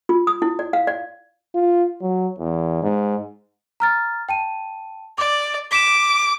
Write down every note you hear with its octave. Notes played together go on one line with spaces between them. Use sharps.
F4
D#6
E4
D5
F5
D5
F4
F#3
E2
G#2
A#5 F6 A6
G5 A5 D#7
D5 D6
D6 B6 D7 E7